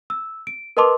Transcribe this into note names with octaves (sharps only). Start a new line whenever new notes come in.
E6
D7
A#4 B4 D#5 A5 C6 D6